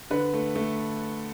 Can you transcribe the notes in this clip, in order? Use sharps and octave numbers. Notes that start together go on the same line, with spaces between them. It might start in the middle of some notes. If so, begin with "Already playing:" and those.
D3 B4
A3
A3